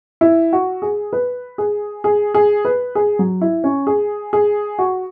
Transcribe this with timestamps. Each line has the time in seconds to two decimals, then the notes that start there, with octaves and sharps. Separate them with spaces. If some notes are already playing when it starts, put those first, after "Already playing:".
0.21 E4
0.53 F#4
0.82 G#4
1.13 B4
1.58 G#4
2.04 G#4
2.34 G#4
2.65 B4
2.95 G#4
3.19 F#3
3.41 E4
3.64 C#4
3.87 G#4
4.33 G#4
4.79 F#4